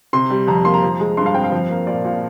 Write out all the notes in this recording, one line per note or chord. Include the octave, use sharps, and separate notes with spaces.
C3 C6
G3
F2 A#5
A#3 C6
A#5
F3
G#3
G2 C6
F5
C4 G5
F5
F3
A#3
A#2 D5
A#2